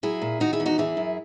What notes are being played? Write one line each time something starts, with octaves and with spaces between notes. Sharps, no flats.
F#3 E4 G#4
A#2
D#3 D#4 F#4
E4 G#4
E2
D#4 F#4
E3 E4 G#4
F#2